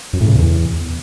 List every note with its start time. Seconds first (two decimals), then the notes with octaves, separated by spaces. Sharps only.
0.13 F#2
0.21 A2
0.28 C#3
0.35 E2